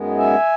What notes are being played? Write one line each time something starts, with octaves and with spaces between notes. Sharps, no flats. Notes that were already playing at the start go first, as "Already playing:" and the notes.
Already playing: F#2 D#3 G#3 B3
E5 G#5